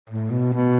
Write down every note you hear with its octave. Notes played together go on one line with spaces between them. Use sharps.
A2
B2
B2